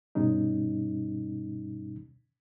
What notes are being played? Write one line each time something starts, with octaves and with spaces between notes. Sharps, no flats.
G2 B2 G3 C#4 D#4